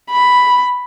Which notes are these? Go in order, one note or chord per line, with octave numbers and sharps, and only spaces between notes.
B5